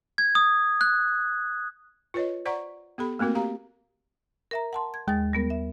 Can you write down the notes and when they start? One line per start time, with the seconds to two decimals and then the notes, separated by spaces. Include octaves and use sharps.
0.18 G#6
0.35 D#6
0.81 F#6
2.14 F4 B4 C#5 D#5
2.46 C5 D5 F#5 A#5 C#6
2.98 B3 G4 A4 B5
3.19 A3 A#3 C4 F#4 A#4
3.35 G4 F5 A#5
4.51 A#4 E5 A#5
4.73 F#5 A5 C6
4.94 G#6
5.08 D#2 G#3 A6
5.33 G3 B3 A#4
5.50 E5